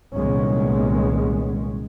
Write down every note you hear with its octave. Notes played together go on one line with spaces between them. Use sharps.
C2 A#2 D#3 G#3 B3 C#4